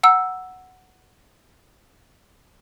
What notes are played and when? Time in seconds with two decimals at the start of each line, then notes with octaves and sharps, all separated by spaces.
0.03 F#5 A#5 E6